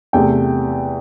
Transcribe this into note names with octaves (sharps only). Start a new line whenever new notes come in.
E2 C3 A3 G5